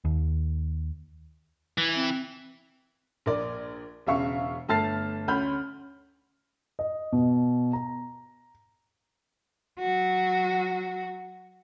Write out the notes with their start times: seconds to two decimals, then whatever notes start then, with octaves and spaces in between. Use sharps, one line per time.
0.05 D#2
1.78 E3
1.95 C4
3.26 A#1 A#4 D5
4.07 E1 C#3 E5 F5 C#6
4.68 G1 A3 A5 F6 A6 C7
5.28 D2 D3 C#4 B5 F6 G6
6.79 D#5
7.12 B2
7.73 A#5
9.79 F#3 F#4